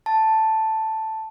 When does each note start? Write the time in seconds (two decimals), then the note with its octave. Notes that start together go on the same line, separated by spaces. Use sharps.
0.06 A5